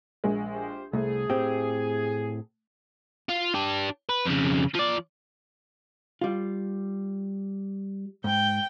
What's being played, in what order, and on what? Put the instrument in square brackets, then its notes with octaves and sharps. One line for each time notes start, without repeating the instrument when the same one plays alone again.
[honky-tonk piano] A#1 G#3
[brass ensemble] F4 G4 C5
[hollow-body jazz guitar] C2 [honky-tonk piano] A3 [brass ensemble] G#4
[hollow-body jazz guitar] A2 C4 G4
[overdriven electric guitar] F4
D4 G4
B4
F2 C#3
F3 D5
[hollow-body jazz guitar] G3 F4
[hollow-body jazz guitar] G#2 [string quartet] G5